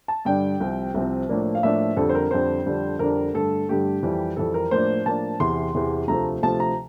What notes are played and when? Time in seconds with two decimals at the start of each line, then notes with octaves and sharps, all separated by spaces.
0.08 A5
0.25 G2 D3 G3 D4 G5
0.60 C2 C3 F3 C4
0.94 C2 C3 F3 C4
1.29 A2 F3 A#3 D4
1.55 F5
1.63 A2 F3 A#3 D4 E5
1.97 F2 D3 G3 C4 A4
2.09 C5
2.15 A#4
2.31 F2 D3 G3 C4 C5
2.66 F2 D3 G3 D4
2.99 F2 D3 G3 D4 A#4
3.34 G2 D3 A3 A4
3.68 G2 D3 A3 G4
4.03 F2 E3 G3
4.37 F2 E3 G3 A4
4.54 A#4
4.71 A2 F3 A#3 D4 C5
5.06 A2 F3 A#3 D4 A5
5.40 E2 C3 E3 C6
5.75 E2 C3 E3
6.08 D2 C3 F3 A3 A#5
6.42 D2 C3 F3 A3 A5
6.60 A#5